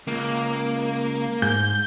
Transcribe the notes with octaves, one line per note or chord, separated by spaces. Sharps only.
C#2 A#3
G#2 G6